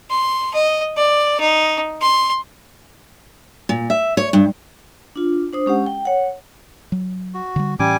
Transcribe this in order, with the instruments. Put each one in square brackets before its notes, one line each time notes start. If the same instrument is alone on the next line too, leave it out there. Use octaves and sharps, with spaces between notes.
[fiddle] C6
D#5
D5
D#4
C6
[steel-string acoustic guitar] A#2
E5
C#5
G2
[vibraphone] D4 F4
D4 C5 D#6
G#3 C#4 G4 F#5
G5
C#5 F#5
[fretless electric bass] F#3
[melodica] F#4
[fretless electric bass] D3 G3
[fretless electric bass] A2 E3 C#4 [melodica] G3 G#5 D6